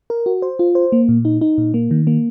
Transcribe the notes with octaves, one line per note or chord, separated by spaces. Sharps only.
A#4
F#4
C5
F4
C5
A#3
A#2
D#4
D#4
A#2
A#3
D#3
A#3